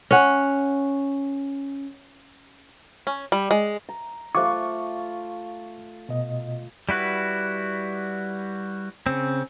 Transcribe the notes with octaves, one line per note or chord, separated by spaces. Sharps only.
C#4 F#5
C#4
G3
G#3
A#5
A3 F4 C5 F5 C#6 D6
B2 D#5
G3 E4 F#4 B4
C#3 C4